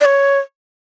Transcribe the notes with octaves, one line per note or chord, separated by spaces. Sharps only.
D5
C#5